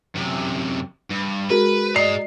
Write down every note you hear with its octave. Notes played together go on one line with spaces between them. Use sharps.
F#2 C3
G2
G#3 F#4 G#4 A#4 B4
G#4 D5 D#5 A#5 C7